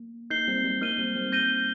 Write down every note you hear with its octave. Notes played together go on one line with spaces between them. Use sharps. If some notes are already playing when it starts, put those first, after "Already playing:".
Already playing: A#3
A#3 D#4 G6 C7 G7
G3 C4
G3 C4
A#3 D#4 F6 D#7 G7
G3 C4
G3 C4
G6 A#6 D#7 G7